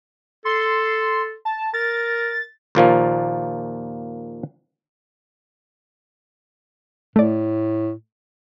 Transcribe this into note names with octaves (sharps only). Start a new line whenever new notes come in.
A4 C6
A5
A#4 A6
D#2 A#2 F3 A#3
A2 A3 D5